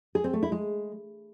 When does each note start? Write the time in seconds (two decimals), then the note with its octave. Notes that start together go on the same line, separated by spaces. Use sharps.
0.15 G#4
0.24 C4
0.33 A3
0.43 E4
0.52 G#3